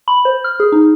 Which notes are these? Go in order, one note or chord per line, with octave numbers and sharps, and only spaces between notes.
B5
C5
F6
G#4
D#4